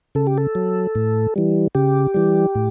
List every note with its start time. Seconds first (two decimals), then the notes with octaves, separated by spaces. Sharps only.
0.15 C#3 A4
0.27 G4
0.38 A4
0.55 F#3
0.95 A2
1.36 E3 G3
1.75 C#3 G4
2.14 E3 G3
2.55 A2